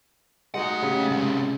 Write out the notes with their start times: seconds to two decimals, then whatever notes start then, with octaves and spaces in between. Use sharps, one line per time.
0.54 G#3 A3 D#4 F#4 F#5
0.82 C#3 G4
1.11 C3 G#3